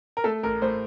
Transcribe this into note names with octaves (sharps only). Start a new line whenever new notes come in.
A#4
A3 A4
A1 A#4
A2 C5